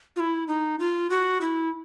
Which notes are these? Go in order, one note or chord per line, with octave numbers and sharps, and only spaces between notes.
F4
E4
D#4
F4
F#4
E4